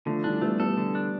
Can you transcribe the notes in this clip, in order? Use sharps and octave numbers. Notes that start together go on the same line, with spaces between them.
D3 F3 A3
E3 G3 D4
G3 A3 B3
G3 B3 A4
D3
D4